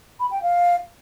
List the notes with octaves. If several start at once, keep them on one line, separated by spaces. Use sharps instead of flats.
B5
G5
F5